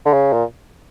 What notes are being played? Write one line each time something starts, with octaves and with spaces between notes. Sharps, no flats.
D3
C#3
A#2